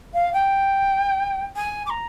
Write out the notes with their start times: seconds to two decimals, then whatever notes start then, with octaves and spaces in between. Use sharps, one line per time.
0.14 F5
0.34 G5
1.56 G#5
1.86 D6
1.90 A#5